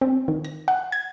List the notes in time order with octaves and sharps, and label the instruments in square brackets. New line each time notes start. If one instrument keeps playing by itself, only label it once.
[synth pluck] C4
D#3
A#6
F#5
G#6